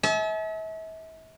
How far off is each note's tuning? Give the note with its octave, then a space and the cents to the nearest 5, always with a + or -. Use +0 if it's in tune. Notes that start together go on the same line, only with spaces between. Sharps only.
E5 -40 A5 -45